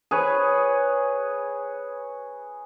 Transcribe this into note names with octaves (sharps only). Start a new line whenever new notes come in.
G#4 B4 C#5